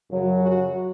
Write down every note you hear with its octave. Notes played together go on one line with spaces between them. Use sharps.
F#2 C#3 F#3
F#4